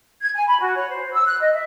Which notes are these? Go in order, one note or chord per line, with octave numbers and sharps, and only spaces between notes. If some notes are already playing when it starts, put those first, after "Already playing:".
G#6
G#5
B5
F#4
C#5
C5
E6
F#6
D#5
E5